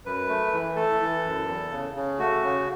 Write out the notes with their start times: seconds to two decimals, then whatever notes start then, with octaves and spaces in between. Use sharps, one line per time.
0.05 F#2 B4
0.29 A3
0.53 E3
0.76 A3 A4
1.00 E3
1.24 F#2
1.47 E2
1.71 C#3
1.95 C#3
2.19 A3 F#4
2.42 C#3